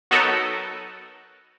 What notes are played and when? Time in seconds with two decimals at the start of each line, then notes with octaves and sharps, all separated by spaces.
0.11 F#3 B3 D#4 F#4 A4 A#4